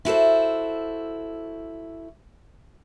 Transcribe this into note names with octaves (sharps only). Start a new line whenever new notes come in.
E4 F#4 A4 C5